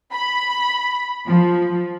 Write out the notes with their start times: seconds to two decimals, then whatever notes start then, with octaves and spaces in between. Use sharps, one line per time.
0.13 B5
1.25 F3